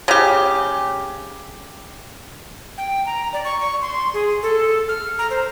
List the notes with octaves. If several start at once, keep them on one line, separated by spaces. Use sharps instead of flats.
C#3 G4
G5
A#5
D5
C#6
C#6
C6
G#4
A4
F6
A#5
C5